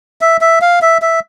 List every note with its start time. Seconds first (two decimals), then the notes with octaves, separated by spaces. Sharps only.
0.21 E5
0.41 E5
0.61 F5
0.82 E5
1.02 E5